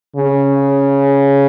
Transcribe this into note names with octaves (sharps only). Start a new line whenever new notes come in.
C#3